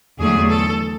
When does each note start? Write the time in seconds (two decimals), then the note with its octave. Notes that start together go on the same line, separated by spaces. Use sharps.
0.19 E2 D3 F#3 A3 G#4
0.49 A4